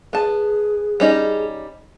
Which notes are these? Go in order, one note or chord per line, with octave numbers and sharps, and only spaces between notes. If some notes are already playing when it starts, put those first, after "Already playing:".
B3 G#4 A5
G3 C#4 D#4